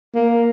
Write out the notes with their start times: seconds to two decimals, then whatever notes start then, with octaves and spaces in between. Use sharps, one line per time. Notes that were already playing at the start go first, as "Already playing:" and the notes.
0.15 A#3